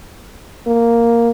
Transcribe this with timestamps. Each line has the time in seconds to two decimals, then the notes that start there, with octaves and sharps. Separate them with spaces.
0.67 A#3